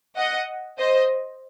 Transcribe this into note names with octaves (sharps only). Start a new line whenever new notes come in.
D#5 F#5
C5 D#5